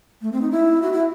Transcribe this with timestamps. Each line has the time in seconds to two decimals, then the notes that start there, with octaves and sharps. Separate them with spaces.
0.22 A3
0.32 C4
0.42 D#4
0.51 E4
0.82 F#4
0.93 E4